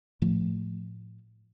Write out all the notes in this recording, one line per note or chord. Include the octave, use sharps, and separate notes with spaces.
A2 F3 A3